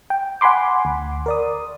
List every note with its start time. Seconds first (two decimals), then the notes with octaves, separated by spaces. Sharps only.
0.10 G5
0.41 F#5 G#5 B5 C6 D6
0.85 D2
1.26 A#4 D5 D#6